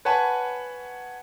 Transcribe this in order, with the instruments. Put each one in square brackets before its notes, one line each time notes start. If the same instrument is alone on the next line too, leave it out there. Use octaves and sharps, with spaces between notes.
[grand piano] B4 C#5 F#5 G#5 A5 B5